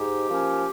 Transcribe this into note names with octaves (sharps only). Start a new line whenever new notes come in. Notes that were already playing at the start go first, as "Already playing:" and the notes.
Already playing: G#2 G4
F3 A#3 C#4